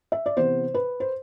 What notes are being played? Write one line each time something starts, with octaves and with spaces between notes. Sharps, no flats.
E5
D5
C3 E3 B3 C5
B4
C5